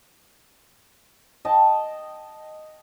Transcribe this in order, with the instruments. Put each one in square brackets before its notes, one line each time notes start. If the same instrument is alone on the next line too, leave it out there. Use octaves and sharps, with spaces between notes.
[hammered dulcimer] D#5 G5 A5